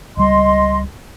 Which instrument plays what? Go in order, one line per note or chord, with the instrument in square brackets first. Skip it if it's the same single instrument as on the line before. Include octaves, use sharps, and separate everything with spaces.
[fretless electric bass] C#2 G3 [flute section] D#5 C6